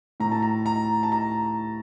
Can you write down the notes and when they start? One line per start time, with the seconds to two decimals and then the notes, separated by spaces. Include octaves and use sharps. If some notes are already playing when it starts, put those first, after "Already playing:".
0.20 A2 A#5
0.32 A5
0.42 A#5
0.66 A#5
1.03 A5
1.12 A#5